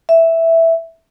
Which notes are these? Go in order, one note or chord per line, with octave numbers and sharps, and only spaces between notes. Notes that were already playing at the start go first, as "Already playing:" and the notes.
E5